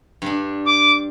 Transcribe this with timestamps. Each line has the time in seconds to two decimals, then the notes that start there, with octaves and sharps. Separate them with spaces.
0.22 G2 G3 D4
0.65 D6